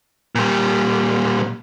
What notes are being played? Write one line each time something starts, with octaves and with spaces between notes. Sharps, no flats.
A#2 G3